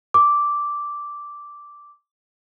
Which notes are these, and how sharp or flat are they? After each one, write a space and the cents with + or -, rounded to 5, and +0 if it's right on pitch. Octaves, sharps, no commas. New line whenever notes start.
D6 -5